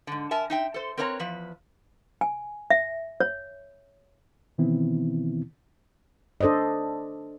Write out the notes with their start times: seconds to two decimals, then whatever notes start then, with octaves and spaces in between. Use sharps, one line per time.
0.07 G#2 D3
0.31 A#4 E5 G#5 A5
0.50 D#4 E5 G5
0.74 A4 C5
0.97 C4 A#4 B4 C#5 D#5 A#5
1.19 E2 F3 B4
2.21 G#5
2.70 E5
3.20 C#5
4.58 B2 D#3 E3 B3 C4 E4
6.41 D4 A4 C5 D5 D#5